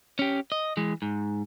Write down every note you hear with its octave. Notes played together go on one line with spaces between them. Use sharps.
C#4 G4
D#5
E3 G#3
G#2